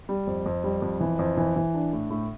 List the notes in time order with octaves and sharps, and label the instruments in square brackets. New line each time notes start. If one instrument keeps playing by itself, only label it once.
[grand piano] G3
F2
F2
G3
F2
E3
F2
E3
E3
D4
A2
A2